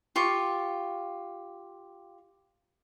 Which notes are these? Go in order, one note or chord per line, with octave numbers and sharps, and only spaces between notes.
F4 G4 C#6